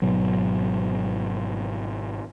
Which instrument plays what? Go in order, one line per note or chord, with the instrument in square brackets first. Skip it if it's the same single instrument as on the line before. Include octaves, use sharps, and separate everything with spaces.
[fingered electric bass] G#1 G#2 B2 F#3